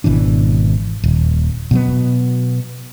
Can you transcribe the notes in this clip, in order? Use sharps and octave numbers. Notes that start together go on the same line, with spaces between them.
G#1 B2 E3 D4
D#1
B2 F#3 B3